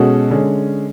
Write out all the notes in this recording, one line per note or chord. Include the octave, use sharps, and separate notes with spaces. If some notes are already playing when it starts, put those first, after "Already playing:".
Already playing: B2 G#3 C#4 F#4 A4
D3 G#3 C#4